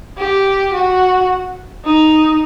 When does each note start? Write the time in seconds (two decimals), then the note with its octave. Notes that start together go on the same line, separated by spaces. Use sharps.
0.18 G4
0.73 F#4
1.84 D#4